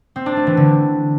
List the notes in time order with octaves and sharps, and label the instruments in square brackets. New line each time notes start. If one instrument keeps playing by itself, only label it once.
[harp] C4
D4
A3
E3
D3